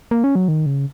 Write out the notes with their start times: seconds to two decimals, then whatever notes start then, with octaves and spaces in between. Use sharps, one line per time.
0.11 A#3
0.24 C#4
0.35 F#3
0.48 D#3
0.66 C#3